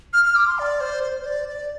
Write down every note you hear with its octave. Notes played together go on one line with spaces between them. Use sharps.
F6
F6
D6
C6
D5
C5
C5
C5
D5
D5